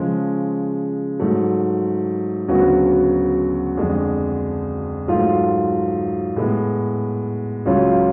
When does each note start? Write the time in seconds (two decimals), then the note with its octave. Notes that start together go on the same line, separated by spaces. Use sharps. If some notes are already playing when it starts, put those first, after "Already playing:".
Already playing: C#3 F3 G#3
1.19 G#2 F#3 A3
2.48 D2 C#3 F#3 B3 F#4
3.78 F2 D3 G#3 D4
5.08 G#2 F#3 A3 F4
6.36 A2 G#3 B3
7.66 C#2 C#3 F#3 C#4 F4